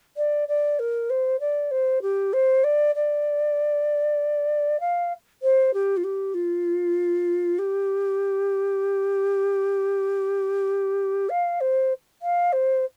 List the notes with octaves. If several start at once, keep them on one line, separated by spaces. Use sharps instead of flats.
D5
D5
A#4
C5
D5
C5
G4
C5
D5
D5
F5
C5
G4
F4
G4
F4
G4
F5
C5
F5
C5